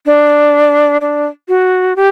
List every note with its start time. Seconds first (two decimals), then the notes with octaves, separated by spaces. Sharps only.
0.06 D4
1.01 D4
1.48 F#4
1.96 G4